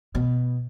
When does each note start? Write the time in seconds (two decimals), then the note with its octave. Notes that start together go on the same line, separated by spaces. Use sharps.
0.15 B2